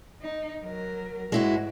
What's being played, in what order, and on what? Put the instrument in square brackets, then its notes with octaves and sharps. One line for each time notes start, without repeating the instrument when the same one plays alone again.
[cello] D#4
F#3 A#4
[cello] G#2 [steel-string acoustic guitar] G#3 E4 F#4